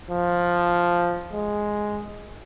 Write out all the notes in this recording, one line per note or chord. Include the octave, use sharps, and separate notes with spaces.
F3
G#3